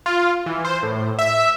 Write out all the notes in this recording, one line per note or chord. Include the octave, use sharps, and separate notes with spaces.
F4
E3
C5
A2
E5